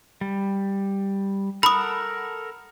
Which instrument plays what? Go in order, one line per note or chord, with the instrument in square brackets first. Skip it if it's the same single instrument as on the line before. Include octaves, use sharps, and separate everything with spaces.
[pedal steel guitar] G3
[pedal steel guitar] A4 A#4 F#5 [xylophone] B5 D#6